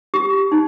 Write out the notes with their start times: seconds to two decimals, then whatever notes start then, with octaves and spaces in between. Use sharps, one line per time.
0.14 G4
0.52 D#4